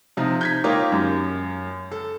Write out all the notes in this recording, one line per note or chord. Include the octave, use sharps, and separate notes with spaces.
C3 F3 D#4
G6 G#6 B6
A#3 D#4 F4 G4 C#5
F#2
A4